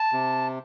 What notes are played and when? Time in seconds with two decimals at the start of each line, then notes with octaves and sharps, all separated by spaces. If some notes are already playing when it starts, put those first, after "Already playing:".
Already playing: A5
0.13 C3